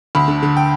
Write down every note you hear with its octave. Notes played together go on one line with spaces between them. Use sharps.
D2 B5
D3
D3
G5